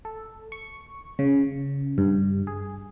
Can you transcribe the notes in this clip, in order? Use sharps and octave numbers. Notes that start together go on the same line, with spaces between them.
A4
C#6
C#3
G2
G#4